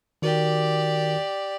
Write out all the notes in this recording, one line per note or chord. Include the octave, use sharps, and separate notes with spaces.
D#3 F#4 G4 A#4 D5